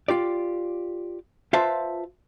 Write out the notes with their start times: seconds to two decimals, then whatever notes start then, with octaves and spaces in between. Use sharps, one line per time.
0.08 F4 G4 D5
1.53 F4 B4 C5 E5 F5 A5